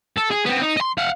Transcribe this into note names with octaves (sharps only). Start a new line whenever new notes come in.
A4
G#4
B3 C4
D#4
D#5 C6
F5 F#5